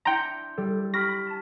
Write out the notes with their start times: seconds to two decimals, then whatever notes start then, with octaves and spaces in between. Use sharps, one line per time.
0.05 D4 E4 G5 A#5 C6 G6 C#7
0.58 G3 A4
0.94 G4 B5 C#6 F6 A#6 B6
1.27 A5